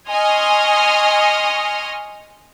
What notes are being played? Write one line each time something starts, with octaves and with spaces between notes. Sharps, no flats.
D#5 G#5 C6 C#6 D#6 F6